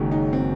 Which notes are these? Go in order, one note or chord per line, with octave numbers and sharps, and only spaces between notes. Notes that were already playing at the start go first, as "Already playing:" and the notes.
Already playing: F#1 F#2 D#3 G#3
D#4
C4